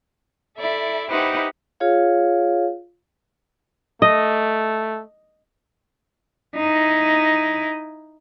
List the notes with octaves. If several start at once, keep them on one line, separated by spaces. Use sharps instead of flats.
E4 A4 D5 E5
D#4 E4 G4 B4 C5 F#5
F4 G#4 C#5 F5
A3 D#5
D#4 E4